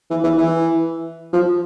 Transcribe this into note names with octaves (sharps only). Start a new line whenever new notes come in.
E3
E3
E3
F3